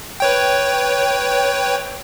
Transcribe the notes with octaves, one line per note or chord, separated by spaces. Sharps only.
B4 C#5 G5